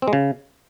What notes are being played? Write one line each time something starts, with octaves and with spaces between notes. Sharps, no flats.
C4
G#3
C#3